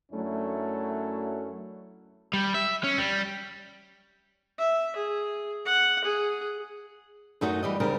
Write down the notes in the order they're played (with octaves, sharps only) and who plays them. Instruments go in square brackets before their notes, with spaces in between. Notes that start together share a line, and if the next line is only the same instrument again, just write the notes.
[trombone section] F#2 F#3 A3 C#4 D4 E4
[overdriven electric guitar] G3
E5
C#4
G3
[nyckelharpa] E5
G#4
F#5
G#4
[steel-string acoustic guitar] F#2 A3 D#4 F#4
E3 G3 D#5
D2 C#3 G3 A#4